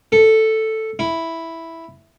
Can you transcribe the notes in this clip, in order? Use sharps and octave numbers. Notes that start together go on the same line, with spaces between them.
A4
E4